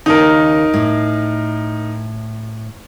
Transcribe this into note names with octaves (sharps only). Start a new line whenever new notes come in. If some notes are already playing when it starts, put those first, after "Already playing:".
D#2 C#3 D#4 A#4
A2